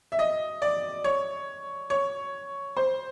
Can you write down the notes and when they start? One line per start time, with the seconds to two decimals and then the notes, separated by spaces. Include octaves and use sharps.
0.12 E5
0.19 D#5
0.62 D5
1.04 C#5
1.90 C#5
2.77 C5